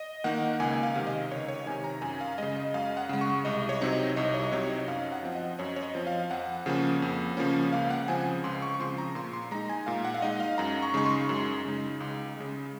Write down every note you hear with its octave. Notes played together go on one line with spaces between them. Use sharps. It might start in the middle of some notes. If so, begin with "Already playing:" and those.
Already playing: D#5
D#3 A#3 D#4 F#5
C#2 G#5
F5
C3 D#3
D#5
C#2 C#5
C#5
C3 D#3 G#5
A#5
F#2 G#5
F5
C#3 G#3 D#5
D#5
F#2 F5
F#5
C#3 G#3
C#6
C2 D#5
C#5
C3 F#3 C4 D#4
D#5
C2 D#5
C#5
C3 F#3 C4 D#4 C#5
D#5
F#2 F5
F#5
F3 C4
D#5
F#2 C#5
C#5
D#5
F3 C4
F5
F2 F#5
C#3 F3 A#3 C#4
F2
C#3 F3 A#3 C#4
C#2 F5
F#5
C#3 F3 C4 G#5
C#2 C6
C#6
C#6
C#3 F3 C4 C6
A#5
A#2 C6
C6
G#3 D#4 A#5
G#5
A#2 F5
F#5
F5
G#3 D#4 D#5
F5
F#2 A#5
C#6
C#3 G#3 D#4 C#6
C6
F#2
C#3 G#3 D#4
C#2
C#3 G#3